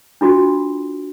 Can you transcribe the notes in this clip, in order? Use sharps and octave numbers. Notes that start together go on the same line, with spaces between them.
D4 F4 F#4